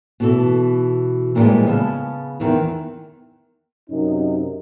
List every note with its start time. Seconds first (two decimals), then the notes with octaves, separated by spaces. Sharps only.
0.20 B2 E3 A4
1.35 A#2 D3 E3 F3 G3 G#3
1.67 C#3 B3 A5
2.40 E2 G2 D#3 E3
3.90 F#2 C3 C#4 D#4